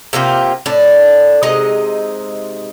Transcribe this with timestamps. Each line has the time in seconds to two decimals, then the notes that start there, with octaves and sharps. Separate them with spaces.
0.13 C3 A#3 F4 G4
0.66 A2 D4
1.43 C3 G#3 D#4 D#5